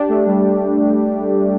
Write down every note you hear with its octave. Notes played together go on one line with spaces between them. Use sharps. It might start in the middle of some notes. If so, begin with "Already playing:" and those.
Already playing: D4 G4
A3
G3